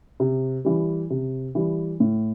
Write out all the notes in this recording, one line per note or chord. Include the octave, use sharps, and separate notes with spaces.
C3
E3 G3
C3
E3 G3
A2